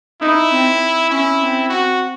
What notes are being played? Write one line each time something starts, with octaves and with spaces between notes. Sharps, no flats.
D#4 E4
C4
C#4 E4
C4
F#4